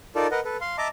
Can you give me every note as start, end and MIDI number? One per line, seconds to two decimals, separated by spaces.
0.16 0.27 63
0.16 0.27 65
0.16 0.27 69
0.16 0.27 70
0.16 0.27 74
0.16 0.27 81
0.31 0.40 70
0.31 0.40 71
0.31 0.40 75
0.31 0.40 78
0.45 0.57 69
0.45 0.57 71
0.61 0.76 77
0.61 0.76 84
0.78 0.88 75
0.78 0.88 76
0.78 0.88 81
0.78 0.88 82
0.78 0.88 86